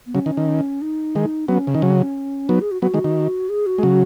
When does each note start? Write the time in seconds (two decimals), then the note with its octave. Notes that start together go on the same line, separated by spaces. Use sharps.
0.06 B3
0.15 C#3 F#3 C#4
0.26 D#3
0.37 D#3
0.82 D#4
1.15 D#3 G#3
1.48 F#3 B3 C#4
1.67 C#3
1.74 D#3
1.82 C#3 F#3
2.49 F#3 B3 D#4
2.61 G#4
2.71 F#4
2.82 F#3 B3 F#4
2.94 D#3 G#3
3.04 D#3
3.49 G#4
3.66 F#4
3.78 G#3
3.83 C#3 F#3